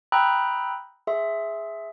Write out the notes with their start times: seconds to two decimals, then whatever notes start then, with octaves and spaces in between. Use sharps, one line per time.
0.12 G5 A#5 B5 D#6 E6 F#6
1.07 G#4 E5 C6